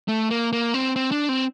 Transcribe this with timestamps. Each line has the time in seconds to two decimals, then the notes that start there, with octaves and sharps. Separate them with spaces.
0.08 A3
0.30 A#3
0.53 A#3
0.74 C4
0.96 C4
1.11 D4
1.29 C4